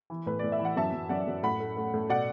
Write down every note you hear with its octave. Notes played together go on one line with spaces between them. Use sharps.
E3
A2 B4
A2 D5
E5
E3
F#5
F#2 E5 A5
F#2
F#2 D5 F#5
F#2
A2 F#5 B5
A3
A3
A2
B2 D5 F#5